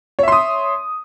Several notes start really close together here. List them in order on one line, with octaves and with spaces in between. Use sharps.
C#5 E5 C6 D#6